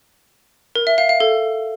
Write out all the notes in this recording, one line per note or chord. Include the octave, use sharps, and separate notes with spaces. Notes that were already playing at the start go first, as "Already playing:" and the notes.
A#4
E5
F5
F5
A4